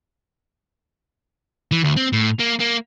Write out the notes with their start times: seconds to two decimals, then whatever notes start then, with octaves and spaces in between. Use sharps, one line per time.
1.72 E3
1.84 D2
1.97 C4
2.13 A2
2.39 A#3
2.60 A#3